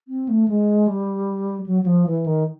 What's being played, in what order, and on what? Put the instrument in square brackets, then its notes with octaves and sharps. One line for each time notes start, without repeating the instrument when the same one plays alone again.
[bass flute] C4
A3
G#3
G3
F#3
F#3
F3
E3
D#3